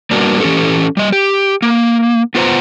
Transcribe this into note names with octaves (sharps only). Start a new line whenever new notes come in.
G3 A#3 B3 D4 F#4 A#4
E3 C#4 G4 A4
G3 D#5
G4
A#3
B3 F4 B4 C5 F#5 A#5